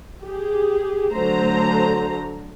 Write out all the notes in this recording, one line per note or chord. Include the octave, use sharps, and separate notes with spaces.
G4 G#4
D3 F#3 A3 C5 A#5